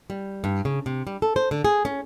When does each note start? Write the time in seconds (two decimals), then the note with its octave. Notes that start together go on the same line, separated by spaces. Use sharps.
0.10 G3
0.44 G2
0.65 C#3
0.86 C3
1.07 G3
1.22 A4
1.36 C5
1.51 D3
1.64 G#4
1.85 C#4